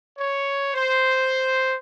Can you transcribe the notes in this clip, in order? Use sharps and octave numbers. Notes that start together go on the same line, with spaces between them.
C#5
C5